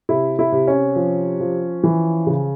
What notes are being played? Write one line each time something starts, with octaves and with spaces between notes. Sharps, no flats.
C3 E4
E4
C3
C#4
F3
F3
E3
C#3